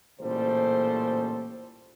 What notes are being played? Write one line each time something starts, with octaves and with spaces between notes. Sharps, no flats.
A1 A#2 C#3 G3 A4 C5